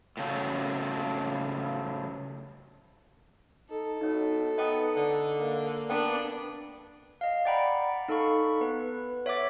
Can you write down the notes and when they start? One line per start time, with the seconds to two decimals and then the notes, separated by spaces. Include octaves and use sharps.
0.17 A2 C#3 F#3
3.70 D#4 A4
4.01 B2 D#4 C#5
4.58 B3 D#4 D#5 G5 D#6
4.96 D3
5.38 A#3
5.90 B3 D4 A#4 G5
7.21 D#5 F5
7.45 D5 F#5 G5 A#5 B5
8.08 D#4 A4 F5 B5 C#6
8.61 B3 B4
9.26 C#5 E5 F#5 D6 A6